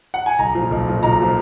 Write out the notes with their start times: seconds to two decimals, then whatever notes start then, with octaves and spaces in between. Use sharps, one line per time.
0.14 F#5
0.26 G#5
0.39 B1 A#5
0.55 A#2 F3
0.71 B1
0.86 A#2 F3
1.03 B1 A#5
1.19 A#2 F3